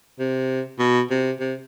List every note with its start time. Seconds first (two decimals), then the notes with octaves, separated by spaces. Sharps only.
0.19 C3
0.79 B2
1.10 C3
1.40 C3